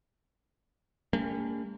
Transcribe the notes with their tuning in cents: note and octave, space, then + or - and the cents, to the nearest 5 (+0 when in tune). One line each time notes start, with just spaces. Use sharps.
G3 +45 A#3 -40 C#4 +40